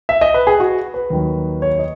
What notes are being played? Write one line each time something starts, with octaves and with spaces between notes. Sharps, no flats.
E5
D#5
B4
G#4
F#4
B4
D#2 D#3 F#3
C#5
D#5